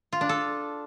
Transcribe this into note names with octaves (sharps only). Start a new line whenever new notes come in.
F4
D4
A4